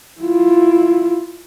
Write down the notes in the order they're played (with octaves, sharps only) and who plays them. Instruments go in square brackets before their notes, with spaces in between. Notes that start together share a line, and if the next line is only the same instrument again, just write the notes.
[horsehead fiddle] E4 F4